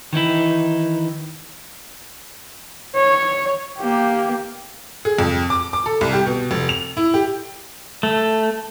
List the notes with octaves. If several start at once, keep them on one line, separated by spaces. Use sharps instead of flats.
D#3 E3 D#4 E4
C#5
A#3 G4
G#4
F2
D6
D6
A4
C2
G4
B2
F1
F7
E4
G4
A3